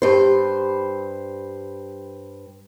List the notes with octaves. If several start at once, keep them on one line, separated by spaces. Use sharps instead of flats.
G2 C5